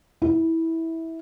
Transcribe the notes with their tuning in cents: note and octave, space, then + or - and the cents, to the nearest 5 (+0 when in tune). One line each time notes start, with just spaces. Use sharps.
E4 -15